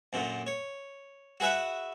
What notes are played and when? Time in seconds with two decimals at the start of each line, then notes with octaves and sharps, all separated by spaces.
0.13 F#2 A#2 D3
0.47 C#5
1.40 F#4 G#4 B4 E5 F#5